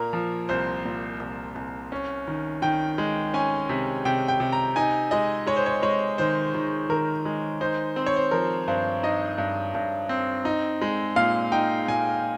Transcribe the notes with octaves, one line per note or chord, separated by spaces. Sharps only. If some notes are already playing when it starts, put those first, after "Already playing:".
Already playing: A#2 A#3 A#4
F3
C2 C5
A#2
C2
C2
C#4
D#3
D#3 G5
G#3
C#4 G#5
C3
C3 G5
G5
C3
A#5
D#4 G#5
G#3 D#5
G#3 C#5
C5
C#5
G#3 C#5
D#3 C5
D#3
D#3 A#4
G#3
D#4 C5
C4 C5
C#5
C5
F3 A#4
G2 C5
D#4 D#5
G2
G2
C4
D#4
G#3
A#2 F5
D#4 G5
A#2 G#5